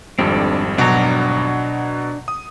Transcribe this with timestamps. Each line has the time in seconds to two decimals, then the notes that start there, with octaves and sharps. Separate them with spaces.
0.19 G#1 F2 G3 C4 D4 A4
0.78 B2 F#3 D4 A#5
2.28 D#6